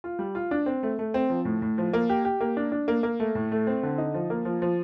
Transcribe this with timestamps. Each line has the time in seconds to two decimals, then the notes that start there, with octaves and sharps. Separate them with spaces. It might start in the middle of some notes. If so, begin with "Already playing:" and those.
0.04 F4
0.19 G3
0.35 F4
0.51 D4
0.66 C4
0.83 A3
0.99 A3
1.14 C4
1.30 F3
1.45 A2
1.62 A2
1.78 F3
1.93 A#3
2.10 G4
2.25 G4
2.41 A#3
2.57 D4
2.72 D4
2.88 A#3
3.03 A#3
3.20 A3
3.35 A2
3.52 A3
3.67 C4
3.83 D3
3.98 D#4
4.14 F3
4.30 A#3
4.45 F3
4.62 F3